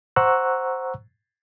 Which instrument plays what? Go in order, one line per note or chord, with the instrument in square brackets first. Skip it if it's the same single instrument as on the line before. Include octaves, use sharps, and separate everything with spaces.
[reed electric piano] C5 F#5 A#5 C#6 E6 F#6